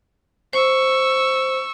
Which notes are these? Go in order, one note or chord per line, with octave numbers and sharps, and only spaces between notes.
C5 C#6 E6